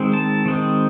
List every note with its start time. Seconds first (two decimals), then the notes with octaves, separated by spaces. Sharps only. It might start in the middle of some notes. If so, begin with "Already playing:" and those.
Already playing: D#3 G#3 C4
0.13 A5
0.46 D#3 G#3 C4